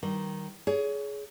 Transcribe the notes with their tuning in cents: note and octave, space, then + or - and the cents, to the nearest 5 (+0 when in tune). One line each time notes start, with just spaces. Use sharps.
D#3 +0 G3 -30
G#4 +15 C#5 +30